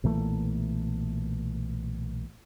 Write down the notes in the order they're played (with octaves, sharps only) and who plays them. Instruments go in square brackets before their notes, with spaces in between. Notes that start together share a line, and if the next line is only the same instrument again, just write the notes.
[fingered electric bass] B1 A#2 E3 A3